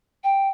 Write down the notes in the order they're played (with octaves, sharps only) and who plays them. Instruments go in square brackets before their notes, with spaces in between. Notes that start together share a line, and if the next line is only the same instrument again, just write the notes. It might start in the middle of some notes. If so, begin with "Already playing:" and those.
[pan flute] G5